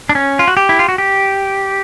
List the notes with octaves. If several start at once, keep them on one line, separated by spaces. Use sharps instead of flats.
D4
C#4
F4
F#4
G4
E4
F4
F#4
G4